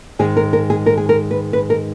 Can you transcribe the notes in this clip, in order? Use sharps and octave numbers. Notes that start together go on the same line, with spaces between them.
G#2 D#3 G#3 G#4
A#4
A#4
G#4
A#4
G#4
A#4
B4
B4
A#4